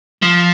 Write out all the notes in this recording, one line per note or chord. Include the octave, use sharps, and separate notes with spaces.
F3